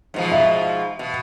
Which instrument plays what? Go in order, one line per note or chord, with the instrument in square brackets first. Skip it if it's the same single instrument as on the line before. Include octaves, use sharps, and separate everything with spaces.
[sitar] G#2 B2 F3
[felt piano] E5
[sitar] B2